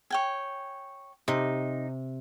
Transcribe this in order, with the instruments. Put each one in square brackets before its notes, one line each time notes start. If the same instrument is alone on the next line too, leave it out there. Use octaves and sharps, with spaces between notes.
[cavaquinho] C#5 G5 G#5
[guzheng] C3 [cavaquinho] D#4